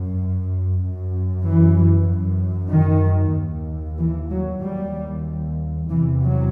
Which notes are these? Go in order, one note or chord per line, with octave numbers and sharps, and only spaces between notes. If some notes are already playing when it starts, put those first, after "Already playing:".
Already playing: F#2
F#2
E3
F#2
D#3
D#2
E3
F#3
D#2 G3
E2 C3 E3
F#3